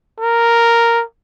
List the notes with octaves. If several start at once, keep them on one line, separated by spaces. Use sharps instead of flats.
A#4